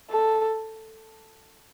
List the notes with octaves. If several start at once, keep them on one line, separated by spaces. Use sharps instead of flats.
A4